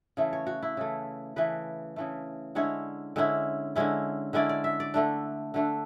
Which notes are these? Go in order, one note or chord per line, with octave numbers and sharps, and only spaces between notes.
C#3 E3 A3
C#5
F#4
E4
C#3 E3 A3
C#3 E3 A3 B4
C#3 E3 A3
D3 G#3 C#4 E4 C#5
D3 G#3 C#4 E4
D3 G#3 C#4 E4
D3 G#3 C#4 E4 D5
D5
E5
D5
D3 A3 D4
D3 A3 D4